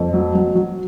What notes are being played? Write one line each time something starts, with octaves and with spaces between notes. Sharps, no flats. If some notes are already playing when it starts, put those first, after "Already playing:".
Already playing: F2
F#3
F#3
F#3